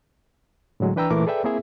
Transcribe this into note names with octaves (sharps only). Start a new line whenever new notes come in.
A2 D3 F#3 G#3
E3 D4 B4 G5 A#5 E6
A#2 E3 A3 E4 A#4 D6
G#4 A4 B4 D5 E5 G5
A#3 C4 E4 G#4 E5